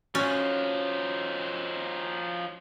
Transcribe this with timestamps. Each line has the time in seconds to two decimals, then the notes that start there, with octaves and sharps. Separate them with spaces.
0.15 F3 C#4 D#4 F#4 C#5 F#6